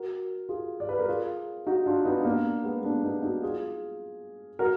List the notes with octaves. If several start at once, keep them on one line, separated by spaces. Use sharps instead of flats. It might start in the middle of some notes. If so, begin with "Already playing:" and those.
Already playing: F#4 A#4
F4 G#4
D5
B4
A#4
F4 G#4
D#4 F#4
D4 F4
B3 D#4
D#4
A#3 D4
G#3 B3
A#3 D4
B3 D#4
D#4 F#4
F4 G#4
F#4 A#4